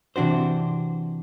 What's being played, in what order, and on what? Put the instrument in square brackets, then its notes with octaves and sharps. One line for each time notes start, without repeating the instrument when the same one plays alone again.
[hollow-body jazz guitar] C3 E3 D4 F#4 C5